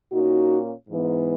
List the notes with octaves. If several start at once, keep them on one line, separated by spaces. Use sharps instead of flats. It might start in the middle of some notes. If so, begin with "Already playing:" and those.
A#2 A#3 C#4 D#4 F#4
G#2 E3 B3